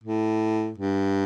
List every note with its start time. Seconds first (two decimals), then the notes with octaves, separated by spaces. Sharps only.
0.04 A2
0.78 G2